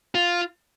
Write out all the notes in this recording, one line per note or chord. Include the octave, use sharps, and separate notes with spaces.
F4